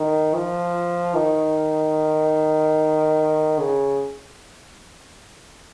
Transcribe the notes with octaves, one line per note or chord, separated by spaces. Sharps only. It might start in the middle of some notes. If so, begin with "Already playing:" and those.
Already playing: D#3
F3
D#3
C#3